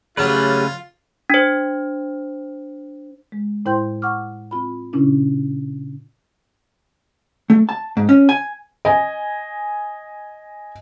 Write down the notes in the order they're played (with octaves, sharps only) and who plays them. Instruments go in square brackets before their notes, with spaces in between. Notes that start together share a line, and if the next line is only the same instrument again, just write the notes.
[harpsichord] C#3 F#3 [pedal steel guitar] A3 C#4 B4 [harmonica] F4 [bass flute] G4
[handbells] D4 C5
[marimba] G#3
A2 E4 C5 G5 C6 G6
F#5 C#6 D6 F6
C4 F4 B5
A#2 C#3 C#4 D4 E4
[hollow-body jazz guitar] A3
A5
G#2
C#4
G#5
[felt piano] D#5 G#5